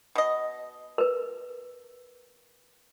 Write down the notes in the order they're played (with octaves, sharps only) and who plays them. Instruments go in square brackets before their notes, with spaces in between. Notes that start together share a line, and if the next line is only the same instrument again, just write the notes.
[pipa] B2 D#5
[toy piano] A#4 B4